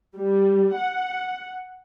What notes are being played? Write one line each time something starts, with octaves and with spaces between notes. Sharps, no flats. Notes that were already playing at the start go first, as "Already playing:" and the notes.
G3
F#5